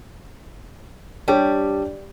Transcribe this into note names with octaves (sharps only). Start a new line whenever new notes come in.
G3 D4 G4 C#5